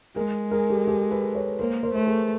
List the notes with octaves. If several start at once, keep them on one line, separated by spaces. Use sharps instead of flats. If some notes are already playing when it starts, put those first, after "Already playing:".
G#3 G#4 A#4
G#4 A#4
G4 A4
G4 A4
A4 B4
B4 C#5
A#3 A#4 C5
A#4 C5
A3 B4
G#4 A#4